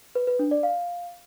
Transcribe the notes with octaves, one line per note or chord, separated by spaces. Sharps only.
B4
B4
D4
D5
F5